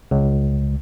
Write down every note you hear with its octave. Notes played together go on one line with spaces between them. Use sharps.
C#2